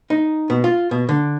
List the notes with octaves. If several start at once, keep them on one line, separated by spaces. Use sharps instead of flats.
D#4
B2
F4
B2
D3